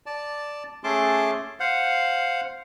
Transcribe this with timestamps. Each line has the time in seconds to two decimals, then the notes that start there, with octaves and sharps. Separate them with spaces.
0.06 D5 A5
0.84 A3 C#4 G#4 A5 C6 D6
1.60 C5 F5 F#5